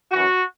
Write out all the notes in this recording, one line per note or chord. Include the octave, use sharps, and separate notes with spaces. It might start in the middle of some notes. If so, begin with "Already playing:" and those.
F#2 E3 F#4